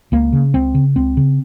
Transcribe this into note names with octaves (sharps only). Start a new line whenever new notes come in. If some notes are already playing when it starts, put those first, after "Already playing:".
C#2 A#3
C#3
C#2 C4
C#3
C#2 C4
C#3